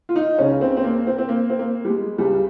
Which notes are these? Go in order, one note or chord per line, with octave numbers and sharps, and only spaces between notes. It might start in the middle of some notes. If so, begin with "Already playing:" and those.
F4
D#4
C#2 C#3 C#4
C4
C4
A#3
C4
C4
A#3
C4
A#3
G3
G#3
C#2 C#3 G3